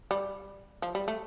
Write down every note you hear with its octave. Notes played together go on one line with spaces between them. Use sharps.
G3
F3
G3
A3